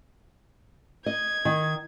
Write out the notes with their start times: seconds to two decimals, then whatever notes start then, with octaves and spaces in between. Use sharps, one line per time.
1.06 D#5 G#6
1.45 D#3